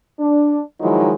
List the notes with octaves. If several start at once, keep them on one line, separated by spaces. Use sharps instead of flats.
D4
D#3 F3 F#3 G#3 D#4 E4